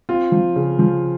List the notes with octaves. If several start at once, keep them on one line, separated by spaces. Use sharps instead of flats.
C4 F4
F3
C#3
F3